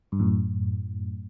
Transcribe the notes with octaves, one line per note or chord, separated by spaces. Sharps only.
G2
F#2 A2